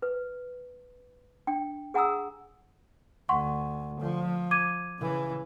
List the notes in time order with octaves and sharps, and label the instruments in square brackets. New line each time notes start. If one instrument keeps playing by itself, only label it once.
[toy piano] B4
D4 G5
G#4 F#5 G#5 A#5 D#6 E6
[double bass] D2 [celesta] F#5 C6 C#6
[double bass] F3
[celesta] D6 G#6 D#7
[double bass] C#3 E3